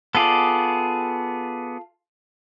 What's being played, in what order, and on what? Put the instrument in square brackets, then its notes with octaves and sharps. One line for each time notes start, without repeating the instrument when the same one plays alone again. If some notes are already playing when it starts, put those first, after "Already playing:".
[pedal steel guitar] B3 G#4 D5 [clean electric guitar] F4 A4